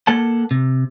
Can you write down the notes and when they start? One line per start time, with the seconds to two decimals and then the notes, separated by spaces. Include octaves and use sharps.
0.07 A#3 A4 F#5 A5
0.51 C3